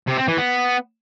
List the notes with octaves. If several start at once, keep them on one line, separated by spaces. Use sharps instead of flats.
C3
C4
E3
B3